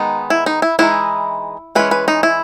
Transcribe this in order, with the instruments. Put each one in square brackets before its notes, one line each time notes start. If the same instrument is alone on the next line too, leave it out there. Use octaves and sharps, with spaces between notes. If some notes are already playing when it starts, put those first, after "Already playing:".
Already playing: [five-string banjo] D#3 G#3 B3 D#4
E4
D#4
E4
E3 G#3 B3 D#4 E4
E3 G#3 C#4 B4
B4
D#4
E4